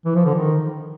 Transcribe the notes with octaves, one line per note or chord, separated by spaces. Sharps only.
E3
F3
D3
D#3